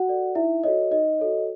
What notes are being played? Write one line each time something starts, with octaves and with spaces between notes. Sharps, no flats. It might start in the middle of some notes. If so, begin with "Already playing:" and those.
Already playing: F#4 F#5
A4 D5
D#4 E4 E5
F#4 A4 C#5 D#5
D#4 D#5
F#4 A4 C#5